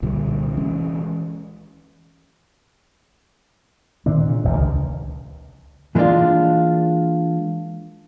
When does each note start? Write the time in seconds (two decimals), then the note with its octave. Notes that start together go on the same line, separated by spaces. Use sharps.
0.02 C2 A#2 D3 G3
0.57 E3 G#3 C#4
4.06 A#2 D#3 C4 D4
4.27 A#2 C#3
4.44 E1 A#1 C3
4.56 C#2 C3 D#3
5.95 E3 G#3 A#3 B3 D4 F4